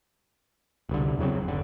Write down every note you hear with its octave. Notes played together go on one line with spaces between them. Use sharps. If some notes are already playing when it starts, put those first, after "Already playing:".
E1 C2 D3
E2 C#3 F#3 C4
G1 D3